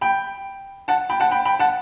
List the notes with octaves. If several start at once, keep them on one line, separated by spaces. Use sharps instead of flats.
G5 B5
F#5 A5
G5 B5
F#5 A5
G5 B5
G5 B5
F#5 A5